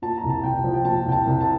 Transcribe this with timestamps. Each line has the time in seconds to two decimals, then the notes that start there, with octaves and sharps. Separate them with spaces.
0.02 A#2 A5
0.18 A#5
0.23 C2
0.30 A5
0.43 C2 G5
0.64 F3
0.74 G5
0.85 A#2 A5
1.05 C2 G5
1.12 A5
1.26 C2
1.41 A5